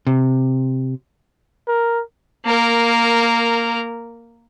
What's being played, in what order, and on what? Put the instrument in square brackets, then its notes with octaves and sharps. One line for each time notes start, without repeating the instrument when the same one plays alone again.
[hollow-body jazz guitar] C3
[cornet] A#4
[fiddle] A#3 A#4